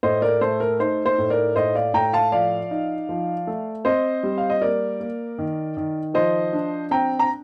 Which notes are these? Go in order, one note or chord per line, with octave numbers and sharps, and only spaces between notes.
A2 C5 D#5
A#4 D5
A3 C5
A#4
D#4 C5
C5
A2
A#4 D5
A2 C5 D#5
D5 F5
A2 G5 A#5
F5 A5
F3 D5 F5
D#4
F3
A3
C4 C5 D#5
G3
F5
D#5
A#3 A#4 D5
A#3
D#3
D#3
F3 C5 D#5
D4
C4 G5 A#5
A#5